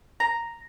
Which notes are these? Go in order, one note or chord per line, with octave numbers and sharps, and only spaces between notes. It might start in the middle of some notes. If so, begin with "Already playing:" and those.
A#5